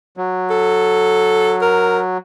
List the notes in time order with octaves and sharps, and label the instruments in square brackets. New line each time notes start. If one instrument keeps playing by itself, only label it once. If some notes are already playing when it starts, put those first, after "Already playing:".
[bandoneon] F#3
[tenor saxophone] A4
A#4